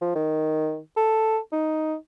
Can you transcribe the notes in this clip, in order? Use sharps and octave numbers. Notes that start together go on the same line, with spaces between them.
F3
D#3
A4
D#4